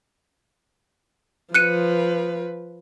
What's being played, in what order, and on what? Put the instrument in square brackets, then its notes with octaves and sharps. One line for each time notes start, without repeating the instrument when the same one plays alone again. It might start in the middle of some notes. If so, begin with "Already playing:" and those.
[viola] F3 B4 [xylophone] F#6 C#7 D#7